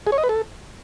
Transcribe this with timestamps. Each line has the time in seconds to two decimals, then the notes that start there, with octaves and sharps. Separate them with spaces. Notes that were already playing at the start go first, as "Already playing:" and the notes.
0.07 G#4
0.12 C#5
0.18 D#5
0.24 B4
0.29 A4